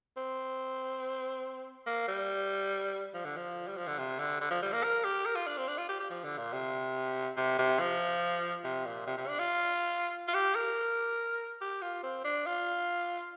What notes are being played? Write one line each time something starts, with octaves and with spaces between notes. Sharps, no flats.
C4
A#3
G3
F3
D3
F3
G3
F3
D3
C3
D3
D3
F3
G3
A#3
A#4
G4
A#4
F4
D4
C4
D4
F4
G4
G4
F3
D3
A#2
C3
C3
C3
F3
C3
A#2
C3
C3
D4
F4
F4
G4
A#4
G4
F4
C4
D4
F4